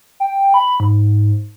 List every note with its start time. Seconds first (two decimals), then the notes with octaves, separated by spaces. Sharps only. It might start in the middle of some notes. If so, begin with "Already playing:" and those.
0.20 G5
0.54 B5
0.80 G#2